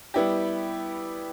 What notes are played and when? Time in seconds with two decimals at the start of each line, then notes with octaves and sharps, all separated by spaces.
0.14 G3 B3 E4 G4